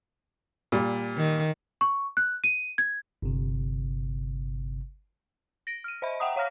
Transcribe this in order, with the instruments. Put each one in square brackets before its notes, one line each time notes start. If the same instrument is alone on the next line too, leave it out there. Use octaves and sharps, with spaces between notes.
[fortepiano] A#2 G3
[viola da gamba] D#3
[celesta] C#6
F#6
D#7
G#6
[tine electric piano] G1 C3
[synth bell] A#6 D7
F6 D#7
C5 D#5 E5 B5
E5 F#5 G5 A#5 D#6
C#5 F5 A#5 F6 A#6